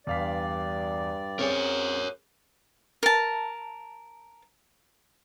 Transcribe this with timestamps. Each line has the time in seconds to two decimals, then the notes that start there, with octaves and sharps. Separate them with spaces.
0.07 E2 G2 D5 F5 B6
1.39 C4 C#4 G#4 A#4 C#5
3.03 A#4 A5